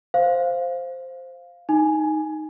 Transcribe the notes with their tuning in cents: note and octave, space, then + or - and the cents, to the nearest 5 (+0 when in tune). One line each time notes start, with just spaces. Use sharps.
C5 +0 F5 +0
D#4 +0 G#5 +0